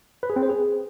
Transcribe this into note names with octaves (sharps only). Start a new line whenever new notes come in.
B4
G#4
C4
C5
G#4